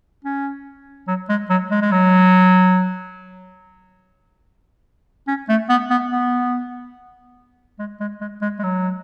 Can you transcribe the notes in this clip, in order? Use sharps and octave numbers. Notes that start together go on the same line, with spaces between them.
C#4
F#3
G#3
F#3
G#3
G#3
F#3
C#4
A3
B3
B3
B3
G#3
G#3
G#3
G#3
G#3
F#3